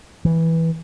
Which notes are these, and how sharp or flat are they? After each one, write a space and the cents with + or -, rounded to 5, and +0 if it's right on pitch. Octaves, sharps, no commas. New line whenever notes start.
E3 -10